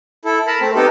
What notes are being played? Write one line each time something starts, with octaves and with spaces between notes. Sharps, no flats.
E4 A4
A#4 A5 B5
A3 C4
B3 D#4 G4 A4